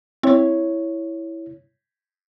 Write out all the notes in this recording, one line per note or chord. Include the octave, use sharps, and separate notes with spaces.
C4 E4 C#5